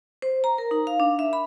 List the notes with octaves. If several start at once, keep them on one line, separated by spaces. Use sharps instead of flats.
C5
A#5
A#4
D#4
F5
D4
E5
B5